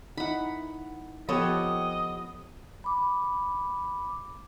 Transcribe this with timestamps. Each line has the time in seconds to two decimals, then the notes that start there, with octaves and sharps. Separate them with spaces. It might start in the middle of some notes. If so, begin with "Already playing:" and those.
0.17 D#4 E4 F#5 B5
1.29 F3 B3 G4 A4 C#5 D#5
2.84 B5 D6